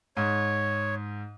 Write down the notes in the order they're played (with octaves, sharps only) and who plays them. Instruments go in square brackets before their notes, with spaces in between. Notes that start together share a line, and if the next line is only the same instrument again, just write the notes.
[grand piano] G#2 [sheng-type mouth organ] C#5